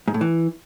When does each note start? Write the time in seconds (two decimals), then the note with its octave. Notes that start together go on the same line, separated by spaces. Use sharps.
0.08 G#2
0.14 A2
0.21 E3